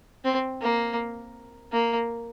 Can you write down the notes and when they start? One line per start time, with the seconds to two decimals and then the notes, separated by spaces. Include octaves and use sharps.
0.24 C4
0.62 A#3
1.73 A#3